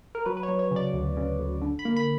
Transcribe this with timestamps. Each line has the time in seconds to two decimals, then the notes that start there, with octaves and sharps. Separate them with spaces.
0.15 A#4
0.26 F#3 B4
0.37 B4
0.43 C#5
0.48 F#3
0.59 C#5
0.71 C#3 D5
0.93 D2
1.17 C#3
1.39 D2
1.61 D3
1.79 B5
1.85 A#3
1.97 B5